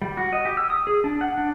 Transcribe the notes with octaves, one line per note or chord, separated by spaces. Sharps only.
G3
F#4
D#5
G4
E6
D#6
G#4
D4
F#5
D4